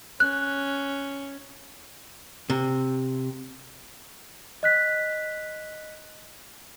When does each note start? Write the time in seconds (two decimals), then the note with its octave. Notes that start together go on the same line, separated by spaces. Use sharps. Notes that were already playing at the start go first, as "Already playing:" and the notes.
0.20 C#4 F#6
2.50 C3
4.63 D#5 F#6 B6